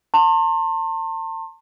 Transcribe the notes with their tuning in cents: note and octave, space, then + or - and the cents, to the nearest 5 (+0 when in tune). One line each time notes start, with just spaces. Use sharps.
A5 +40 C6 +30